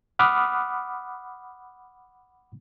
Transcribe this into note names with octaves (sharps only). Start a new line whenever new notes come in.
F#5 B5 D6 D#6 F6 F#6